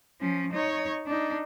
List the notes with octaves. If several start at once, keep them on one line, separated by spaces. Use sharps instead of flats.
F3 C#4
D#4 C#5
D4 D#4